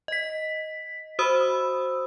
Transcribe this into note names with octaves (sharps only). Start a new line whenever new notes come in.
D#5 B6
F#4 C5 B5 D#6 E6